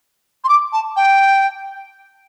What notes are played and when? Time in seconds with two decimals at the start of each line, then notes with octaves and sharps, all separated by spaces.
0.44 C6
0.49 D6
0.73 A5
0.96 G5